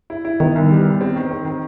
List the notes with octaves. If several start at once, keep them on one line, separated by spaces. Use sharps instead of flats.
E4
E4
D#3 B3
C2
G3
B3
C4
D#3
C4
D#3